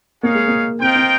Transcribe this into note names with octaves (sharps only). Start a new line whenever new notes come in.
A#3 D#4 G#4 C#5 F5
G#3
A#3
C4 F4 A#4 D#5 G5
C4